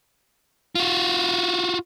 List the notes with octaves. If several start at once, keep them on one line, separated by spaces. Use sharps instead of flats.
F4 F#4